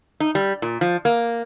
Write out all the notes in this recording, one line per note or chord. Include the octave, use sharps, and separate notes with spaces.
D#4
G3
A#2
F3
A#3